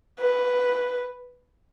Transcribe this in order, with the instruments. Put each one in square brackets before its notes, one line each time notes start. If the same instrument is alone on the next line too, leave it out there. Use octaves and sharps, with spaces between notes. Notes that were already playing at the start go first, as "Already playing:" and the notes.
[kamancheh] B4